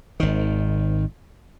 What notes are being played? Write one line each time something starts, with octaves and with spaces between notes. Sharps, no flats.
G#1 D#3